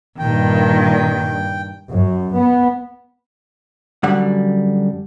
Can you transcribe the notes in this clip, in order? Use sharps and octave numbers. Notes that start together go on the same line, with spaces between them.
G2 A#2 D#3 G5
F#2
B3
F#2 D3 G3 F#5